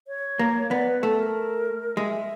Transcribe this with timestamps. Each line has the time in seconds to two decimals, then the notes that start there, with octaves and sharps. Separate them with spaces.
0.08 C#5
0.39 A#3
0.71 B3 D5
0.87 B4
1.02 A3 A4
1.18 A#4
1.97 G#3 E5